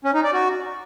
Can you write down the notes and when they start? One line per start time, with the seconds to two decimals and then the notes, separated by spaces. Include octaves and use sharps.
0.05 C#4
0.14 D#4
0.24 D5
0.33 F#4